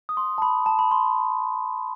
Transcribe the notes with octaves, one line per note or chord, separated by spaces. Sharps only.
D#6
C6
A5
B5
A5
B5
C6